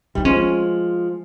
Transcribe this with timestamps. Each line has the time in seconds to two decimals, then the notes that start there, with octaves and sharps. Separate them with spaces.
0.15 G3 D#4
0.25 F3 G#3 C#4